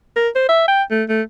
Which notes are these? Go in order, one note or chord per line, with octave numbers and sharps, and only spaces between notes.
A#4
C5
E5
G5
A3
A3